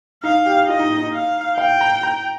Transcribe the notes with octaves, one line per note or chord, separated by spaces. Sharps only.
D#4 F5
G4
F4 D#5
D#4
D#4
D#4
F5
F5 G5
A#5
A#5